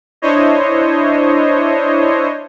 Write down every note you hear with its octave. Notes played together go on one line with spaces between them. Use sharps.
D4 E4 C5 C#5 D#5